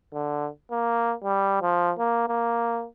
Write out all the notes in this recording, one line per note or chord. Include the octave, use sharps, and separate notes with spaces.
D3
A#3
G3
F3
A#3
A#3